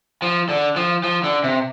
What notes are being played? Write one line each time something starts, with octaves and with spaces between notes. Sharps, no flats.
F3
D3
F3
F3
D3
C3